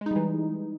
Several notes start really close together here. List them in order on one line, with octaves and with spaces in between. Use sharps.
G#3 D#4 G3 E3